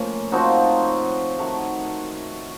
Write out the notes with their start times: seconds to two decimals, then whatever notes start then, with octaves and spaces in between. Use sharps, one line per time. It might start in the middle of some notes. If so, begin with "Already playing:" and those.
Already playing: A2 F3 A#3 C#4
0.32 F3 C4 D#4 F#4
1.38 D#3 A3 D#4 F#4